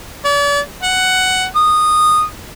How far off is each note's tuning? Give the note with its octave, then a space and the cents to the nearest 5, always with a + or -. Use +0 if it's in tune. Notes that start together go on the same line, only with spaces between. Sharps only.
D5 -40
F#5 +10
D#6 -15